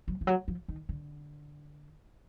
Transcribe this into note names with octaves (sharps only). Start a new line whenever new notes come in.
F#3
F3
F#3
F3
D#3
D3